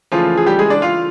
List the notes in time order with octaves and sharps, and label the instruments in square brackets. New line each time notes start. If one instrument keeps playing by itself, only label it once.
[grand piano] C#3 E3 F3 A3 F4
G#4
G3 G4
G#3 G#4
D4 D5
F4 F5